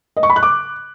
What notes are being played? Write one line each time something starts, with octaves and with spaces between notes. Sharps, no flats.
D#5
C#6
B5
F#6
D6